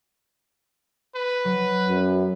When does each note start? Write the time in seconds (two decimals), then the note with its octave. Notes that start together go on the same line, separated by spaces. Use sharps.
1.15 B4
1.45 F#3
1.88 F#2